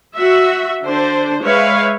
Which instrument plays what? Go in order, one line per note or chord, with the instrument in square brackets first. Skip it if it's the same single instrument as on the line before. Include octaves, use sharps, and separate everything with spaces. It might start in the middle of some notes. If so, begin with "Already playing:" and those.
[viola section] F#4 E5
D3 D4 C5
G#3 B4 C#5 E5 F5